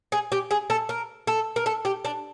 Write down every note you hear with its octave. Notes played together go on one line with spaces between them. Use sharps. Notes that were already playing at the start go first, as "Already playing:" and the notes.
G#4
G4
G#4
A4
A#4
A4
A#4
A4
G4
D4